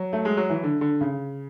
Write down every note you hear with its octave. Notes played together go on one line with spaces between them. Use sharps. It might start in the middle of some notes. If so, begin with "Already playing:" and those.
Already playing: F#3
A3
G#3
F#3
E3
D3
D3
C#3